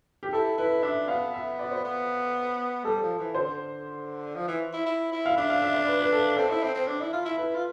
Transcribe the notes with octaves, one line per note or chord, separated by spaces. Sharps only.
G4
E4 A4
E4 B4
D4 E5
B3 F5
E5
D5
C5
B3
G3 A4
F3
E3
D3 C5
F3
E3
E4
E4
E4
F5
D4 E5
F5
E5
D5
B4
B4
A4
C4 A4
E4
C4
C4
D4
E4
F4
E4
E4 B4
F4